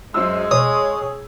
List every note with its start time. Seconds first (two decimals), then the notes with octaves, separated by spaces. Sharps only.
0.14 F#2 G#3 C5 E6
0.51 G#4 C#5 D#6